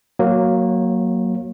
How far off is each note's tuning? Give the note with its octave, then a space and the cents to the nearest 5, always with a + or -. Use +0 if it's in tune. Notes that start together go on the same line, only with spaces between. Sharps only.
F#3 +0 A#3 +0 C#5 -30